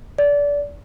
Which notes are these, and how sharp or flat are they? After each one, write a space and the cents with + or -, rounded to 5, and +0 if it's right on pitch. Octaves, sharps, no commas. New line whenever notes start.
D5 -25